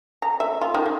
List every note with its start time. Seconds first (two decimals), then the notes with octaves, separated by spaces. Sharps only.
0.22 A#5
0.40 E5
0.61 F4
0.74 D#3
0.86 D#3